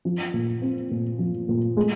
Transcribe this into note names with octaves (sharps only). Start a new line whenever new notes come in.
F3
A#2
C4
A#2
F3
A#2
G#3